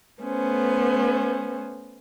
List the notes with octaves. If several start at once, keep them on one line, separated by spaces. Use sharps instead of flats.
A3 B3 C#4 C5